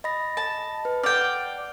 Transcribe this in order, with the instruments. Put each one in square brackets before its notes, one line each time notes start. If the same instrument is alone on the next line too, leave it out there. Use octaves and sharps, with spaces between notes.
[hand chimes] D#5 B5 A#6
[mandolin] A5
[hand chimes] B4
[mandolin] D5 G5 [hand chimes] F#5 F6